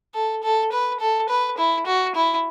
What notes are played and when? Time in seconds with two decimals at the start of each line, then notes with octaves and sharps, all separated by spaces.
0.14 A4
0.43 A4
0.72 B4
1.00 A4
1.29 B4
1.58 E4
1.87 F#4
2.16 E4